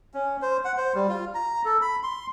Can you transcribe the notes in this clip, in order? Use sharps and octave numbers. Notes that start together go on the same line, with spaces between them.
C#4
C5
F#5
C5
G3
F4
A#5
A4
B5
C6